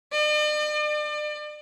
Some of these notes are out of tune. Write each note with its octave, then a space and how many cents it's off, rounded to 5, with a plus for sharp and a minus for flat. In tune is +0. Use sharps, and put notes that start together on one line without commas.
D5 +45
D5 +35